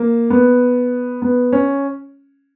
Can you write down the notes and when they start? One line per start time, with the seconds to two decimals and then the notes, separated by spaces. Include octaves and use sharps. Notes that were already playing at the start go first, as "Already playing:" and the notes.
Already playing: A#3
0.30 B3
1.22 B3
1.52 C#4